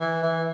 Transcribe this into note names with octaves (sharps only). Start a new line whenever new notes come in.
E3
E3